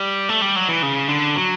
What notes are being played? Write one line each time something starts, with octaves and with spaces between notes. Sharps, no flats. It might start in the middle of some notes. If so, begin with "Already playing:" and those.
Already playing: G3
A3
G3
F#3
E3
C#3
D3
F#3